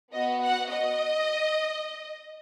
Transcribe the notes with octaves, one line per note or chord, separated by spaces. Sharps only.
B3 F#4 D#5
F#5
D#5